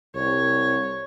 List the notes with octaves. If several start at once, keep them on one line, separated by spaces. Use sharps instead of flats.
C2 C#5